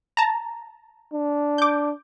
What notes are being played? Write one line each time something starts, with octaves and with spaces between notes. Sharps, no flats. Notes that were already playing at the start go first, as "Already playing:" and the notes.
A5 A#5
D4
D6 G6